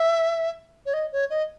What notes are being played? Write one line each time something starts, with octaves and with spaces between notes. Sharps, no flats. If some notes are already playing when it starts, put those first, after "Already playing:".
Already playing: E5
C#5
D#5
C#5
D#5